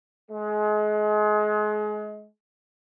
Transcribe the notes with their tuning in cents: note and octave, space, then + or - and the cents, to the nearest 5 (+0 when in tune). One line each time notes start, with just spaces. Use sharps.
G#3 +30